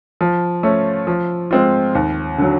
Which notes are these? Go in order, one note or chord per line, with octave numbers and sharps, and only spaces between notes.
F3
A3 C#4
F3
G#3 C4 F4
D#2
D3 F#3